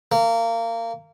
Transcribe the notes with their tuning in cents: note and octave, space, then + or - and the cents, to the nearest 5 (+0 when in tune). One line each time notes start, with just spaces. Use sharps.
A#3 -25